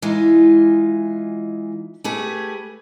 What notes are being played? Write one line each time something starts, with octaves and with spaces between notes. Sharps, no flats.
E3 G#3 D#4 F4
A3 G4 G#4 B4